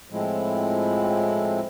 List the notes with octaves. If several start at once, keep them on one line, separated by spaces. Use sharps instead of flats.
A2 F3 G#3 C4 E4